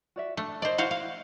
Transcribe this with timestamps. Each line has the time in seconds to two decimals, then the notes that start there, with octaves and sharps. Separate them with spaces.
0.16 F#4 D5 E5
0.37 A3 D4
0.62 C5 D5 D#5
0.78 E4 F#4 C5 F5
0.91 F5